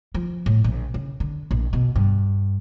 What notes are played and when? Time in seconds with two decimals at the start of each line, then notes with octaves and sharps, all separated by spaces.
0.14 F3
0.46 A2
0.64 A#1
0.94 C#3
1.20 D3
1.51 A#1
1.73 B2
1.96 G2